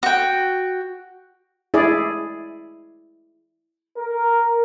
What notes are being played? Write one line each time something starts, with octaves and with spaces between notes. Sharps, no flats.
F#4 G5
E4 G#4 D5
A#4